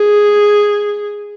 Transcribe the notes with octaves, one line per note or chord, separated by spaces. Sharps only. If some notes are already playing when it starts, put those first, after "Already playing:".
Already playing: G#4